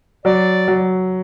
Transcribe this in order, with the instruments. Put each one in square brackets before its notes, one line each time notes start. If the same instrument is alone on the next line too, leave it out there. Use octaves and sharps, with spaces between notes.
[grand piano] F#3 [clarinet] D5
[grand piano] F#3